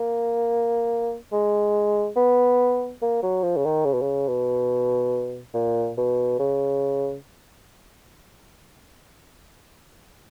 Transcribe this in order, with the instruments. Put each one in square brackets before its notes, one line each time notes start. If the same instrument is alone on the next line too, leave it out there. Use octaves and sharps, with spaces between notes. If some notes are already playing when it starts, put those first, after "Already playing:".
Already playing: [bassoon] A#3
G#3
B3
A#3
F#3
F3
C#3
D#3
C#3
B2
C#3
B2
A#2
B2
C#3